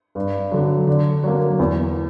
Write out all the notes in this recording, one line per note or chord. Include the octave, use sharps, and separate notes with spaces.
G2
D3 F#3
D3
F#3 A#3
E2